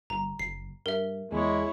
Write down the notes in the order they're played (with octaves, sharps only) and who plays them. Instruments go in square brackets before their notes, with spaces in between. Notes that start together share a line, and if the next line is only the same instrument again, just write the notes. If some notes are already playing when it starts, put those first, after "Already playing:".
[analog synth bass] G1 [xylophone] A#5
[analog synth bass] F#1 [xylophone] C7
[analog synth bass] G2 [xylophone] A#4 E5
[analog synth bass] E2 [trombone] G#3 [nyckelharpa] E4 C#5